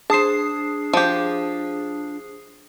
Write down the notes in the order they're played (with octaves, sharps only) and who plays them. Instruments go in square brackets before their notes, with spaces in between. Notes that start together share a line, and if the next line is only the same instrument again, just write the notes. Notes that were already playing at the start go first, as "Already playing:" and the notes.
[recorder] D4 [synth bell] G#4 D#6 C7 [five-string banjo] C5 A5
[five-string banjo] F3 G4